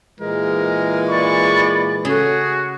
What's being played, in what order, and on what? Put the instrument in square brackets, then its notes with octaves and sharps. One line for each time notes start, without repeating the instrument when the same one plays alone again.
[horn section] A#2 E3 G#3 [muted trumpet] A#4
[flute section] D5 B5 [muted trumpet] C#6
[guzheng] C#3 A3 C#4 [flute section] F#4 [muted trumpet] G#4